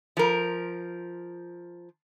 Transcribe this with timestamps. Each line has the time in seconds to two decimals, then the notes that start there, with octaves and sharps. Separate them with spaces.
0.17 F3 A#4